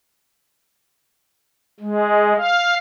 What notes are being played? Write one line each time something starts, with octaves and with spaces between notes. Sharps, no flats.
G#3
F5